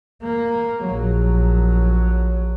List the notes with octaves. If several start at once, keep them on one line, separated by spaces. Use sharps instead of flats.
A#3
A#1 F#3